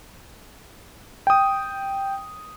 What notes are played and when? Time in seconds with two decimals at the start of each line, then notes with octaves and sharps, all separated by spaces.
1.27 G5 D#6